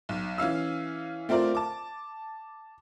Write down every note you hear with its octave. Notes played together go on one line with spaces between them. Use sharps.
B1
E3 C#4 F5 E6
A3 C4 F4 A#4 D5
A5 D6